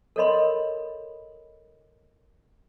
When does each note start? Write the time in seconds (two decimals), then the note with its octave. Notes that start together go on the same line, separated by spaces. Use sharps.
0.16 A4 A#4 C#5 D#5 B5 C6